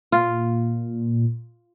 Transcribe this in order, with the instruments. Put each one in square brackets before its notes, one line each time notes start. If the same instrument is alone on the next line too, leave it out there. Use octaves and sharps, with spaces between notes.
[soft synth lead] A#2 [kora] F4